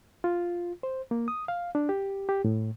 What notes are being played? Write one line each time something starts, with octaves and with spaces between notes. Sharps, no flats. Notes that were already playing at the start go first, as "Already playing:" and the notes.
F4
C5
A#3
D#6
F5
D4
G4
G4
A2